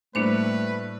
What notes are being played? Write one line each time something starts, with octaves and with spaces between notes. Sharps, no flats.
A2 G3 A3 A#3 D4 G4 B4 C5